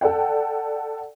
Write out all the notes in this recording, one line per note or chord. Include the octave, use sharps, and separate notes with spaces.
A4 D5 F#5 G5